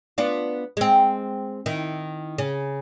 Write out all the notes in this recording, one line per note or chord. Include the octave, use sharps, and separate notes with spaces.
B3 D4 F4
G#3 C4
D#3 E4
C#3